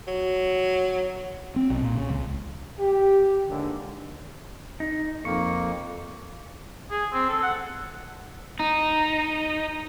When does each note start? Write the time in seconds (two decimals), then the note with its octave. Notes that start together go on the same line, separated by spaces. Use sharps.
0.08 F#3
1.56 C4
1.70 B1
1.82 A#2
1.95 C#3
2.10 C#2
2.78 G4
3.49 D#2 G#2 D3
4.80 D#4
5.25 F2 A#3 C#6
6.91 G#4
7.13 C4
7.29 A4
7.42 F#5
8.60 D#4